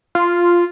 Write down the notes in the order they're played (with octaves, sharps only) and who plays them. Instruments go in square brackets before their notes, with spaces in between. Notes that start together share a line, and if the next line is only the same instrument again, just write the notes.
[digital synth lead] F4